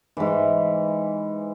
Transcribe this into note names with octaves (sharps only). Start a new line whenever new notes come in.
G#2 E3